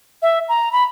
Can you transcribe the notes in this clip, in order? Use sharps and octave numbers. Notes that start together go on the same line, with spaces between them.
E5
A#5
B5